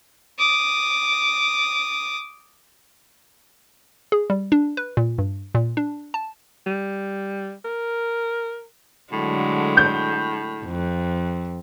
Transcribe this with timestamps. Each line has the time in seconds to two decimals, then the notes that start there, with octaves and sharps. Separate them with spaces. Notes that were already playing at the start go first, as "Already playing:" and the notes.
0.39 D6 D#6
4.12 G#4
4.30 G3
4.52 D4
4.77 B4
4.97 A#2
5.18 G2
5.55 A#2
5.77 D4
6.14 A5
6.66 G3
7.65 A#4
9.13 A2 D3 F#3 G#3
9.77 G6
10.65 F2